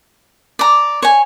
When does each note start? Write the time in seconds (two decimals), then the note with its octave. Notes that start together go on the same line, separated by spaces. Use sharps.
0.59 D5 A#5
1.03 C#5 G#5